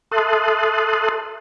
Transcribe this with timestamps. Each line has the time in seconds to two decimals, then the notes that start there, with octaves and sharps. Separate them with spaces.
0.11 A4 E5 A5 C6 D#6 F#6